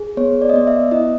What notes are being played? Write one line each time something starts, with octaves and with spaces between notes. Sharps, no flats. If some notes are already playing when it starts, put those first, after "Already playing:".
Already playing: G#4
B3 C#5
D5
D#5
B3 D5
E5
E4 D#5